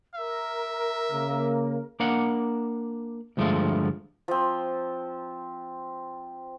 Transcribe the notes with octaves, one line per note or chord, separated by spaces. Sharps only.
A#4 E5
C#3 A#3
A#3 D4 F5 F#5
D2 G2 F3 G#3 A3 F4
F3 C4